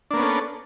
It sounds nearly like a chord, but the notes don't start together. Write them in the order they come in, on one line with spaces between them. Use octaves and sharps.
D4 A#3 B3 C#4 A4